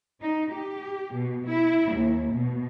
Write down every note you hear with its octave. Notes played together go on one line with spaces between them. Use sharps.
D#4
G4
B2
E4
D#2
B2